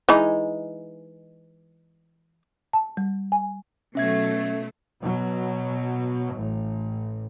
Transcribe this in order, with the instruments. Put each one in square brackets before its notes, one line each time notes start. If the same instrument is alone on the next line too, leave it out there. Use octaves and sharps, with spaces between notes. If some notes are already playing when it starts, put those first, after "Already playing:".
[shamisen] E3 G#3 D#4
[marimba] A5
G3
G#5
[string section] B2 F#3 A3 [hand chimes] C#4 E5 G#6
[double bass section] B2 F#3
A1